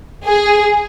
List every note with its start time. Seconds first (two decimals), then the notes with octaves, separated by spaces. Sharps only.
0.25 G#4